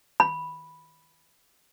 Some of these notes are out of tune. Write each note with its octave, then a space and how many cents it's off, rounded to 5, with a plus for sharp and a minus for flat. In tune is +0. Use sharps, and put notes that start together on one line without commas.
B5 -5